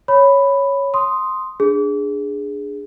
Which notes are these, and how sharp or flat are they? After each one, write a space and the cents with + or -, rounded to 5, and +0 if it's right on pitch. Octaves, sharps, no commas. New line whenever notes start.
C#5 +0 B5 +5
C6 +0 D#6 +0
D4 +0 G#4 -5